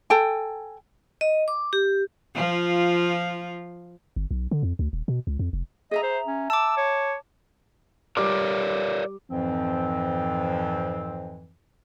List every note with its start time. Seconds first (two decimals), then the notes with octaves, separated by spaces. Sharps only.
0.10 A4 G5 G#5
1.21 D#5
1.48 D6
1.73 G4
2.35 F3 F4
4.16 G1
4.31 B1
4.51 D3
4.63 F2
4.79 D2
4.93 D#1
5.08 B2
5.27 C#2
5.39 F2
5.53 F1
5.91 G#4 D#5 E5 A#5
6.03 C5
6.26 C#4
6.50 A5 D6 E6
6.77 C#5
8.17 G3 A#4 C#5 D5 D6
9.30 F2 G#2 E3 F3 C4